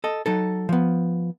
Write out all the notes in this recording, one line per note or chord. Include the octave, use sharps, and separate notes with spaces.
A4 D#5
F#3 D#4 A4
F3 B3